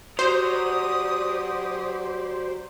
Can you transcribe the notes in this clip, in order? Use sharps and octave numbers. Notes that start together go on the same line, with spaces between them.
F#3 G4 B4 C5 D5 D#6